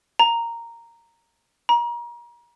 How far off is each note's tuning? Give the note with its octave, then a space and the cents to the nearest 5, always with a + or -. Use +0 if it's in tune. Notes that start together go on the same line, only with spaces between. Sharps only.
A#5 -5
A#5 +30